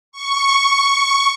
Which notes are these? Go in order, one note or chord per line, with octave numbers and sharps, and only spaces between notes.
C#6